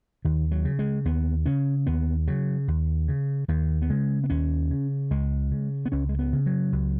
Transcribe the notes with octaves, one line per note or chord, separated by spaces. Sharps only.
D#2 D#3
F#3
C#3
G#3
D#2 B3
C#3 C#4
D#2 B3
C#3 F#3
D#2
C#3
D#2 D#3
B3
C#3 G#3
B3
D#2 C#4
C#3
C#2 G#3
C#3
B3
C#2 C#4
G#3
B3
C#3
F#3
C#2